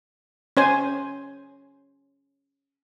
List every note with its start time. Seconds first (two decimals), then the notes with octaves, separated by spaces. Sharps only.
0.57 C#4 C5 G#5